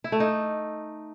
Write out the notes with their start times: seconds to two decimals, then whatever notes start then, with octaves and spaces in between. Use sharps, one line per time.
0.04 E4
0.12 A3
0.20 D#4